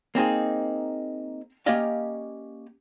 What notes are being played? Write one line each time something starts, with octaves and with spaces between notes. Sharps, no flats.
A#3 C4 D#4 G#4
A#3 C#4 G4 D5 D#5 F5